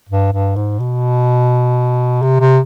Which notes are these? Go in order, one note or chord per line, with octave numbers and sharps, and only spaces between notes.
G2
G2
G#2
B2
C3
C3